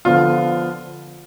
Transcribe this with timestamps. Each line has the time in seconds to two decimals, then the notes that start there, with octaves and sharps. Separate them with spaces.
0.05 D3 F3 B3 D4 F4